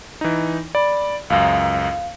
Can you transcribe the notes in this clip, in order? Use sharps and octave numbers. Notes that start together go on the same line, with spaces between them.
E3 D#4
D5 B5
C#2 F#2 F5